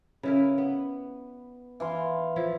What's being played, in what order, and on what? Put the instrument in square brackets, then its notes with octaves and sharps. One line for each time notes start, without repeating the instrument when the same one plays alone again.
[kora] C#3 E4 A#4 [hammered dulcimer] B4
[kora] B3
[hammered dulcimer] E3 F5 C6
[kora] F3 E4